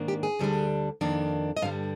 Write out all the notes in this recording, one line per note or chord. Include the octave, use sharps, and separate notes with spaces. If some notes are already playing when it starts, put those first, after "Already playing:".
Already playing: G#2 D#3 A#3 D4
G4
G#4
D2 D3 G3 D4
F2 D#3 A#3 D4
D#5
G2 D3 G3 F5